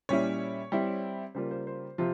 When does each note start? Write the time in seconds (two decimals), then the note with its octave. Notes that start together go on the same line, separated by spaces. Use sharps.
0.09 A#2 G3 C#4 E4 C#5
0.72 G3 C4 E4
1.35 C#3 G3 A#3 F4 C5
1.51 C5
1.67 C5
1.98 C3 F3 C4 F4